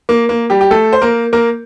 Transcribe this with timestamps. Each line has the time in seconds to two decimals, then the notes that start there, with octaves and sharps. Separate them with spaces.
0.09 A#3
0.29 A#3
0.50 G3 G4
0.61 G4
0.71 A3 A4
0.93 C5
1.02 A#3 A#4
1.33 A#3 A#4